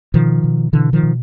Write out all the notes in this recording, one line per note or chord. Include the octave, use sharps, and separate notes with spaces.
B2 D#3 F3
B2
B2 D3 E3
D#3 F3
B2